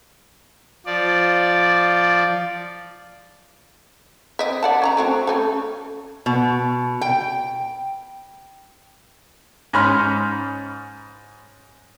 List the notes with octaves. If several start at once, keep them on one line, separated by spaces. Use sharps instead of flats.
F3 D5
C4 D#5 E5
D5 F#5 A5
C#4 A5 A#5
A3 C4 F#4
A3 C#4 A4
B2
G5
G#2 C#4 C#5 B5 C6 F6